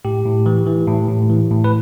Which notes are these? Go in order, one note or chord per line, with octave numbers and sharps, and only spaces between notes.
A2 G4
A2
E3
E3
A2
A2
E3
A2
B4